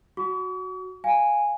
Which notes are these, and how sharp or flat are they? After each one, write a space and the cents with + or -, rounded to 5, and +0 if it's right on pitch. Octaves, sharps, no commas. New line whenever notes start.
F#4 +0 C#6 +45
F5 +5 G#5 -5